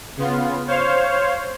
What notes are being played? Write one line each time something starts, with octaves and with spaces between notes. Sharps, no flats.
C#3 B3 F4
C5 C#5 F5